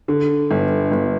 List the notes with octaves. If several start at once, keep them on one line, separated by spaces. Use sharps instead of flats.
D3
G1
G1